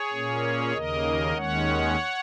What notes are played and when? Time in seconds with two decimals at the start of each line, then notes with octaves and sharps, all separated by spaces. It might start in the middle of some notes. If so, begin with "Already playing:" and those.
Already playing: G#4 C#5
0.12 A#2 A#3 C#4
0.73 D#2 C#3 A#3 A#4 D#5
1.34 D#2 D#3 G#3 C#4 C#5 F#5